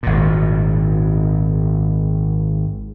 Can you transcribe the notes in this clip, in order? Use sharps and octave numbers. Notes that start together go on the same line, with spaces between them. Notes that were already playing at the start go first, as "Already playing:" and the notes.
G#1 A#2